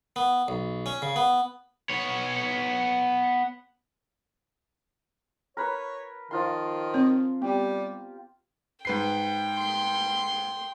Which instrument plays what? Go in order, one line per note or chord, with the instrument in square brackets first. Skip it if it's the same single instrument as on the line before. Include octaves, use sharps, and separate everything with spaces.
[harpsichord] B3
B1
C#4
C#3
B3
[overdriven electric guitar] B3 C#5
[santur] A#4 B4 [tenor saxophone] C#5
[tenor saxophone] D#3 [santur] F3 F4 C6
[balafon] C4 C#5
[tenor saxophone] G3 [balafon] B3 [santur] G4
[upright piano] G#2 B4 C7 [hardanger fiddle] G5
[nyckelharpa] C6